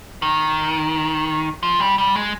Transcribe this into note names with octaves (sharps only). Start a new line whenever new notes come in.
D#3
F3
G3
G3
G#3